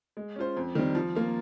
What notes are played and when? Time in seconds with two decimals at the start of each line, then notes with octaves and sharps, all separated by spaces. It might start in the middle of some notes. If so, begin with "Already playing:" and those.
0.17 G#3
0.36 C#4 F4 C5
0.57 F2
0.75 D#3 G3 C4
0.95 F3
1.15 A#3 F4